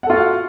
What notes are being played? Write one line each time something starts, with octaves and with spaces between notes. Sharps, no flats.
F4 F#4 A4 F5 F#5